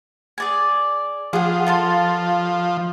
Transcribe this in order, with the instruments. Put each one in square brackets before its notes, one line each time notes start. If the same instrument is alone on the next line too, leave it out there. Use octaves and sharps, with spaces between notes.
[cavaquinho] G#4 D5 G#5
[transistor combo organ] F3 [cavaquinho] G#4 F#5
[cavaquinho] F4 A4 C6